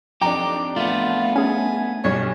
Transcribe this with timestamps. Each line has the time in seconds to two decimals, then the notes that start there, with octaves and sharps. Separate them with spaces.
0.21 F2 D4 D#4 G4 G5 A#5 D6
0.76 A3 B3 F4
1.36 C#4 G#4 G#5
2.04 B1 G2 G3 C#5